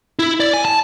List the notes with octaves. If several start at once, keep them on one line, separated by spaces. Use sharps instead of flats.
E4
D5
G#5
A5